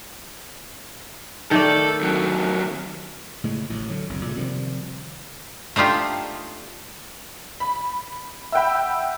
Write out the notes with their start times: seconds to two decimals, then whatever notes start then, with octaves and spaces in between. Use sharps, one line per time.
1.51 D#3 A3 A4 D5
2.01 D#2 F#3
3.44 A2 C#3 G#3
3.70 A1 A2
3.90 D3 F#3
4.09 F#1 C2 F#2
4.25 A#2 C#3 F3 A3
4.37 C3 D#3 F3 G3
5.76 A3 D4 D#4 F4 G4
7.60 B5
8.52 E5 F#5 G5 B5 E6